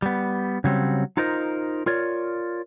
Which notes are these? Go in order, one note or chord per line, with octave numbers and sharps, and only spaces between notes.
G3 B3
C#3 F#3 G3 C4
D#4 F4 A#4 C5 D#5
F4 A#4 C#5 D5